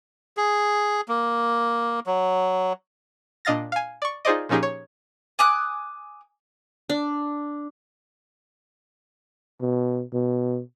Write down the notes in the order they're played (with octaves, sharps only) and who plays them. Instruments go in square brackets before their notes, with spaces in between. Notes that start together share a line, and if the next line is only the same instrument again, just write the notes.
[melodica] G#4
A#3
F#3
[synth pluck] A#2 D4 D#5 F5 A6 A#6
F5 G#5
D5 C#6
D#4 F4 G#4 C5 D5 D#5
A#2 F3 C#4 D#4 G4 G#4
C#5
[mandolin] G#5 D6 D#6 F#6
[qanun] D4
[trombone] B2
B2